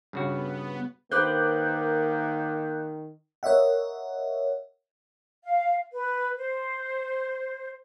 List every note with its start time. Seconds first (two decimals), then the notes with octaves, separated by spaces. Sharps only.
0.13 G2 C#3 B3 F#4
1.11 D#3 A#3 G4 B4 C5 D6 F#6 G6
3.43 A#4 C#5 D#5 E5 F#5
5.44 F5
5.93 B4
6.38 C5